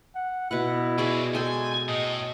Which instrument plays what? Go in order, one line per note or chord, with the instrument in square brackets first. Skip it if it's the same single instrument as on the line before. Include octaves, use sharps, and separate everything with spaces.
[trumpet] F#5
[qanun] B2 B4 F#5 [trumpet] E4
[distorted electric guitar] G#3 F#4 [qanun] G#4 D5
[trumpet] G#3 [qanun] A4 G5 [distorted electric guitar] G#5
[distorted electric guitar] A2 [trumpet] D#5